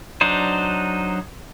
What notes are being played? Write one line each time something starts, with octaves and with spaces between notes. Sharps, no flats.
F#3 D4 D#4 C5